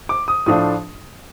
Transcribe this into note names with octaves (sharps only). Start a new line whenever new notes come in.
D6
D#6
A2 F3 A3 D4 F4 D#6